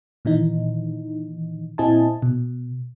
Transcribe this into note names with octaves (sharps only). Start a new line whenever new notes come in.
A#2 D#3 E3 D#4
A#2 C4 E4 D#5 G#5 A5
B2